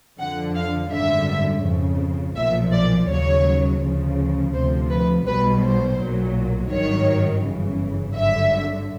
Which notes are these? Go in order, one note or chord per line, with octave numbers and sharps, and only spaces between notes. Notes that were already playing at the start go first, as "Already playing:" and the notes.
F2 D3 F3 F#5
F5
G#1 F#2 D3 G3 E5
F2 C#3 F3
B1 A#2 F3 E5
D5
D#2 C#3 F#3 C#5
D2 C#3 F3
D2 C3 F3 C5
B4
B1 B2 G3 B4
C5
B1 A#2 F#3
G#1 G2 D#3 F#3 C#5
G1 F#2 C#3 E3
G#1 G2 D3 F#3 E5